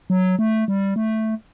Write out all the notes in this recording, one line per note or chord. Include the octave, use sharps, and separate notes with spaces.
F#3
A3
G3
A3